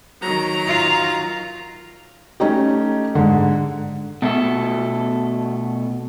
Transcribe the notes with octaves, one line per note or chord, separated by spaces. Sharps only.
D#3 F#3 A#5
F4
A3 C#4 D#4 G4
G#2 D3
B2 A3 B3 A4